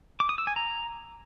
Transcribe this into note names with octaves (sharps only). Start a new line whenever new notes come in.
D6
D#6
E6
G#5
A#5